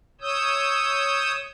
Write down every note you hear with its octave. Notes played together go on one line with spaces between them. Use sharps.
C#5 D#6 E6 G6